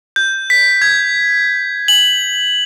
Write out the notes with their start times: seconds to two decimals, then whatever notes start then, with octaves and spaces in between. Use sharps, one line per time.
0.16 G6
0.50 B6
0.82 G#6
1.88 F#7